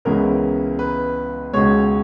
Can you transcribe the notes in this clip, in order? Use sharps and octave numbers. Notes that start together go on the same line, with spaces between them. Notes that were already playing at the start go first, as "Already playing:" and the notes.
C#2 C#3 E3 G#3 B3 A#4
B4
C#2 B2 G#3 C#5